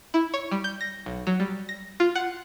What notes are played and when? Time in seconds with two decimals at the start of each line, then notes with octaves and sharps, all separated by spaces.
0.14 E4
0.34 C#5
0.51 G3
0.64 G6
0.81 A#6
1.06 B1
1.27 F#3
1.40 G3
1.69 A#6
2.00 F4
2.15 F#5